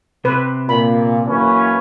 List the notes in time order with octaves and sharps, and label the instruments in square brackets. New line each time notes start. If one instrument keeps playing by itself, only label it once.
[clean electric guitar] C3 [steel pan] B4
[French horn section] A#2 [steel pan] B5
[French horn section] F#2 E3 A#3 [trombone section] C#4 B4